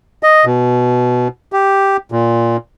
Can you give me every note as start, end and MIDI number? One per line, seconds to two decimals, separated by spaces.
0.23 0.45 75
0.45 1.28 47
1.53 1.97 67
2.12 2.57 46